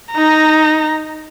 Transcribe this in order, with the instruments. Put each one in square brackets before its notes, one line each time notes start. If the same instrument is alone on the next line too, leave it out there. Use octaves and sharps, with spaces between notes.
[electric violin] D#4 A#5